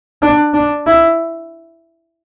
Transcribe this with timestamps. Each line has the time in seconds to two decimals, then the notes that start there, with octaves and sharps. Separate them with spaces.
0.22 D4
0.54 D4
0.87 E4